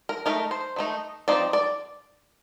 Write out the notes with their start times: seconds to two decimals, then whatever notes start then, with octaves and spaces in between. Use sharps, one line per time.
0.09 A#4
0.26 A3 D#4 A#4
0.51 C5
0.76 D#3 A3 D#4
1.28 F3 C4 D#4 D5
1.53 D5